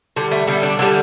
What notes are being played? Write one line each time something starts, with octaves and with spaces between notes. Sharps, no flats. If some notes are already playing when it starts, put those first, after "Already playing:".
D3 G3
A3
D3 G3 B3
D4
D3 G3 A4